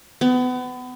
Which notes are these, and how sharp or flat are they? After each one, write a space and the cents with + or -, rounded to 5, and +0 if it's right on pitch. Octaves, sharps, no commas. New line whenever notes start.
B3 +30